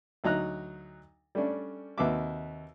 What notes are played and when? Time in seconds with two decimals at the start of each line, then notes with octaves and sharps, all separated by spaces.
0.24 D2 F#3 D#4 A#5 F#6
1.35 G3 A3 C#4 D4
1.98 D#2 C3 F#4 B4 E5 D6